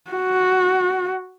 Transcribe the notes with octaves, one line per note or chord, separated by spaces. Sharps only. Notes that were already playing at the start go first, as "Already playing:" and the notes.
F#4